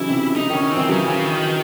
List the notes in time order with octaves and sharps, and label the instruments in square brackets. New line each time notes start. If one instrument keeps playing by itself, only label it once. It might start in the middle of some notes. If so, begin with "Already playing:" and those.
Already playing: [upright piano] C#3 E3 F#3 C#4 D#4 [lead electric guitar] E4
[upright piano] C3
[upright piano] C#3 [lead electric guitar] D#4
[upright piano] D#3
[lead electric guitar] C#4
[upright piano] D#3
[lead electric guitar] C4
[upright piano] E3
[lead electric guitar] C#3 [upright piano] F#3
[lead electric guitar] C#3
D#3